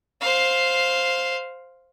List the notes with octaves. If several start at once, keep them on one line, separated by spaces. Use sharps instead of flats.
C5 F5